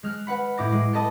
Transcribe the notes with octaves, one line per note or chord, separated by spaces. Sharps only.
G#3 F6 F#6
B4 F#5 B5
A2 E4 D6 A#6
G#3
A4 B4 D#5 A5